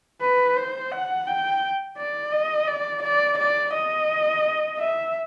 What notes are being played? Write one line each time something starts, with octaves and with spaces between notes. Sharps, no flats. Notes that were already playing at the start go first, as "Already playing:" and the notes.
B4
C5
F#5
G5
D5
D#5
D5
D5
D5
D#5
E5